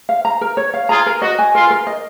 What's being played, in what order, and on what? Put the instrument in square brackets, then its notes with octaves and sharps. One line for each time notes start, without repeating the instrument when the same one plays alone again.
[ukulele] F5
A#5
A#4
C#5
F5
[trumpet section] F4 G#4 [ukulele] A#5
[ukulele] A#4
[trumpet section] F#4 [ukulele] D#5
[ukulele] G#5
[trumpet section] F4 [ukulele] A#4
[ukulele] A#4
D#5